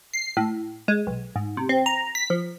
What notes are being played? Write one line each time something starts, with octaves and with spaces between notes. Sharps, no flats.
C7
A2
G#3
B1
G#2
C3
C4
A#5
B6
F3